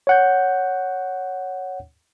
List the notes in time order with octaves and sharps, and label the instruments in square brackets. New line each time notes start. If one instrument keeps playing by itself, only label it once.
[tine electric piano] C#5 F#5 G6